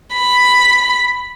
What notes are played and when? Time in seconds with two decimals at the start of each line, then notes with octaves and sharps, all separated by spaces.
0.16 B5